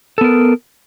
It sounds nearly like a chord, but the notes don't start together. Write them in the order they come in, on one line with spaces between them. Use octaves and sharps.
A4 B3 A#4